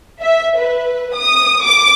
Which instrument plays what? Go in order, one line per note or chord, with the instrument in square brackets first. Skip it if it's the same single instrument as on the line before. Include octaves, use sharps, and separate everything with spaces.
[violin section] E5
B4
D#6
D6